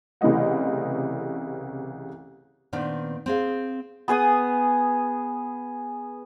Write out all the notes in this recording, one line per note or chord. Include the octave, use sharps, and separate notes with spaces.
C2 C#3 E3 A3 D#5 F#5
A#2 D#3 B3 C4 D4
C4 G#4 F5
B3 G#4 G#5 D#6